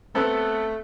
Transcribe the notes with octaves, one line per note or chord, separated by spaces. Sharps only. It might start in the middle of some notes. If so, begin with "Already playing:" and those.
A3 B3 C4 A4